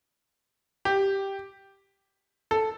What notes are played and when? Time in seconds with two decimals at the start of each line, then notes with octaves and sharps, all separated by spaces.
0.85 G4
2.51 A4